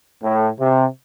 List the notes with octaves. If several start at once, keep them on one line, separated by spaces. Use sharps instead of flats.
A2
C3